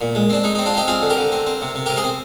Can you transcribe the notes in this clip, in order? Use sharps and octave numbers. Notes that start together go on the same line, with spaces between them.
A#2
G#3
C4 D4
G#3 D#4
C4 D#4
D4 F4
C4 D#4 G4
C4 F4 G#4
D3
G4 A#4
D3
C4
C4
C3
C3
C3 G4 A#4
G#4 C5
C4